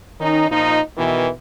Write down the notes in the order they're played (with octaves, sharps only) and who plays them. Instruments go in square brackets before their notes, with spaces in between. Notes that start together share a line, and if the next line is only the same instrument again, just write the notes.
[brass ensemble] D#3 C#4 D#4
A#2 F3 D#4
B2 D#3 E3